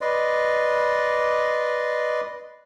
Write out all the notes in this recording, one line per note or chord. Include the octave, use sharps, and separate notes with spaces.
B4 D5 D#5 C6